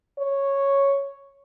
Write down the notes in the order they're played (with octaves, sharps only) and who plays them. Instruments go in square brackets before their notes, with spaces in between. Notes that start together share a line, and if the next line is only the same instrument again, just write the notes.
[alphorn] C#5